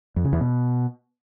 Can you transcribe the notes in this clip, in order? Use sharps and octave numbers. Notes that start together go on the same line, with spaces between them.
F2
C#3
E2
B2